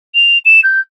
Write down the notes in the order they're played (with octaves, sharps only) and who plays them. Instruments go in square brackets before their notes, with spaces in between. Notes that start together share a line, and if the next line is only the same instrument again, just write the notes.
[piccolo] F7
E7
G6